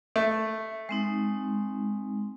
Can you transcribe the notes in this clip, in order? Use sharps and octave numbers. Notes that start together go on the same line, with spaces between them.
A3
G#3 C4 D#4